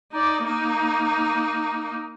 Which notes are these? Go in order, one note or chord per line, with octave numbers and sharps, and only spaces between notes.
D#4 D5
A#3 D#4